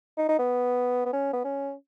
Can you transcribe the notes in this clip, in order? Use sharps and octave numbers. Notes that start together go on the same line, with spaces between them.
D#4
D#4
B3
B3
C#4
B3
C#4